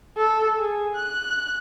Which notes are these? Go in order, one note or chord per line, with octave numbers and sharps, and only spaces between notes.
A4
G#4
F#6